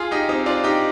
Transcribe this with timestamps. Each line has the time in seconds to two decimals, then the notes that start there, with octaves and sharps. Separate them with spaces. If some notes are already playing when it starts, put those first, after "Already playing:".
Already playing: F4 G#4
0.11 D#4 G4
0.29 C4 D#4
0.46 D4 F4
0.64 D#4 G4